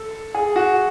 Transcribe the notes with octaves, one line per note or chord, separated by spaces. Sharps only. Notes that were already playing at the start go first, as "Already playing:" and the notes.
Already playing: A4
G#4
F#4